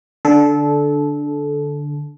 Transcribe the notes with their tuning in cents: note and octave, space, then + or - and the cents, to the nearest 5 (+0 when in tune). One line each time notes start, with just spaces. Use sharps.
D3 +0 A4 -20